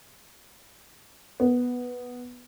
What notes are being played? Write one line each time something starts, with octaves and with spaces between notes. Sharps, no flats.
B3